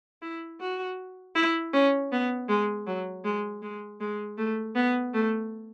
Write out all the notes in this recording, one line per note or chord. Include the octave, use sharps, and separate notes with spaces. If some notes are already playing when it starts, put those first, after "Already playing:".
E4
F#4
E4
C#4
B3
G#3
F#3
G#3
G#3
G#3
A3
B3
A3